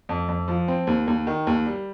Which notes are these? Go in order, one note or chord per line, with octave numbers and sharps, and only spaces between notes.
F2
F2
F3
C4
D#2
D#2
D#3
D#2
G3